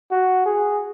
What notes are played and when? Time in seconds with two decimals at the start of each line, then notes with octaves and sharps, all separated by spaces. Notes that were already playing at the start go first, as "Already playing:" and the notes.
0.11 F#4
0.46 G#4